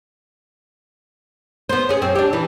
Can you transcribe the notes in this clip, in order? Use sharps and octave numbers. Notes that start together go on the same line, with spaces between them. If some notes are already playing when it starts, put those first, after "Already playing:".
B3 C5
C#4 G#4
F#2 C4
D4 G4
E3